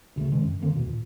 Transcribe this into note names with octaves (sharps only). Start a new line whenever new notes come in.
D2 C#3 G3 A3
C3 D#3 G#3 C#4
F#2
D3 D#3 A#3 C4
D#2 B2
A#2